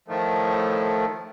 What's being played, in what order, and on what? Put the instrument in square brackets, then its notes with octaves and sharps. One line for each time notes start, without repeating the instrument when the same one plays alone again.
[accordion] A2 D#3 F3 A3